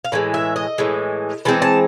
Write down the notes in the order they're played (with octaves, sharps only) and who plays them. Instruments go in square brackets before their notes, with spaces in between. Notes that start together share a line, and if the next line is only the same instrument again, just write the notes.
[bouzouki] F5
A2 E3 G#3
E5
D#5
A2 E3 G#3
E3 G#3 C4 D#4 A5
A5